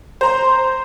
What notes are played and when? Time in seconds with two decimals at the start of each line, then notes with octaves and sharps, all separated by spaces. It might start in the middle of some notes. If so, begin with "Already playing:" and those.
0.21 C5 A#5 C6